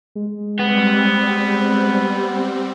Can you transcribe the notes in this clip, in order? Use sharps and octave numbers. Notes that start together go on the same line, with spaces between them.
G#3
G3 B3 C4